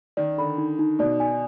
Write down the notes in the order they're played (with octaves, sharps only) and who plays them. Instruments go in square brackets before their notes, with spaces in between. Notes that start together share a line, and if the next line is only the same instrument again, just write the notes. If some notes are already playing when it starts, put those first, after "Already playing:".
[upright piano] D#3 [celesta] D5
[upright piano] D3 [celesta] B5
[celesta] D#4
D#4
[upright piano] B2 [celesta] D5
[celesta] G#5